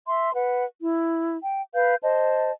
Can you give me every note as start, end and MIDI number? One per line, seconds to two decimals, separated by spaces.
0.08 0.32 76
0.08 0.32 84
0.34 0.65 71
0.34 0.65 78
0.82 1.36 64
1.43 1.63 79
1.74 1.96 71
1.74 1.96 77
1.74 1.96 91
2.03 2.51 72
2.03 2.51 75
2.03 2.51 81